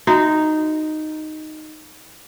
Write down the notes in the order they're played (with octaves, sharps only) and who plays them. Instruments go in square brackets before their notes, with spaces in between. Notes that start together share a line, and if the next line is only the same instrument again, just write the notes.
[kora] D#4 [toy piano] F#4 E5 A#5